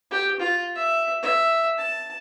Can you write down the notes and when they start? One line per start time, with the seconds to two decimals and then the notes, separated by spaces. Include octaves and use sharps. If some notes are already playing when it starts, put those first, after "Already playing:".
0.11 G4
0.40 F4
0.75 E5
1.22 E5
1.78 A5